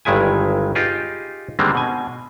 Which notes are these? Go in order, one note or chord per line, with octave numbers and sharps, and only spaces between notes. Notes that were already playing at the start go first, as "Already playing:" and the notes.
G1 G2 D#3 G#3 E4 G#5
D#4 F4 G4 G#4
D3 D#3 G3 G#3 A#3 C4
B2 G#5